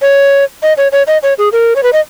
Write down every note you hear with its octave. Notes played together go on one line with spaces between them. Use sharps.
C#5
D#5
C#5
C#5
D#5
C#5
G#4
A#4
C#5
B4
D#5